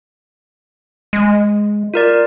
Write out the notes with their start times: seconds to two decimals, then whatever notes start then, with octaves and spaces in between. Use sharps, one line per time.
1.13 G#3
1.94 F4 A#4 D5